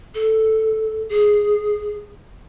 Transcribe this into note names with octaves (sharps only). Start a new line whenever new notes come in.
A4
G#4